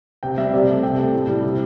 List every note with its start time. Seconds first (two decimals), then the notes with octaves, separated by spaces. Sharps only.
0.23 C3 G5
0.38 G3 E5
0.53 C3 D5
0.68 A3
0.83 C3 G5
0.98 A3
1.13 A2
1.28 G3
1.44 C3